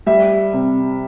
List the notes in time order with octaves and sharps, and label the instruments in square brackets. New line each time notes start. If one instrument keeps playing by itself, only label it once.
[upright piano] G3 [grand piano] E5
[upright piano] C3